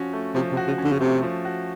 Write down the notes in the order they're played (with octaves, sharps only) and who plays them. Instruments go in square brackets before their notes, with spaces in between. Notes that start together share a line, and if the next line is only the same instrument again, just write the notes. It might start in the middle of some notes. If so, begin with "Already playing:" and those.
Already playing: [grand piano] F3 C#4 F#4
A3
[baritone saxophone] C3 [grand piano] F3
[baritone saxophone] C3
[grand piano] F#4
[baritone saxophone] C#3
[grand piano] C#4
[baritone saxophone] D3
C#3
[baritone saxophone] C3 [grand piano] A3
[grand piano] F3
F#4